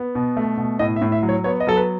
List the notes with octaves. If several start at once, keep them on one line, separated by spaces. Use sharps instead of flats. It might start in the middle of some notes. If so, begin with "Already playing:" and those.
Already playing: B3
B2
A3
B2
A2 D#5
E5
A2
E5
F#3
C#5
B3 C#5
D#5
F#3 A4
B4